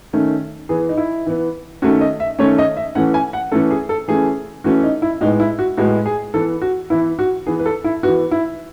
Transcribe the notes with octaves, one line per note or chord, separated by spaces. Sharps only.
D#3 A3 C#4
E3 B3 G#4
D#4
E4
E3 B3
D#3 A3 C#4 F#4
D#5
E5
D#3 A3 C#4 C#5
D#5
E5
E3 A3 C#4 F#5
G#5
F#5
E3 A3 C#4 A4
G#4
A4
E3 A3 C#4 G#4
E3 A3 C#4 F#4
D#4
E4
A2 G#3 B3 D#4
E4
F#4
A2 G#3 B3 F#4
G#4
E3 B3 A4
F#4
E3 B3 E4
F#4
E3 B3 G#4
B4
A4
E4
E3 B3 F#4
E4